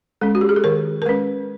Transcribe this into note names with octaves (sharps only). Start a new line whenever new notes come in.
G#3 C#4 A4
F#4
G4
G#4
A4
D#3 A#4
A#4
G#3 C#4 B4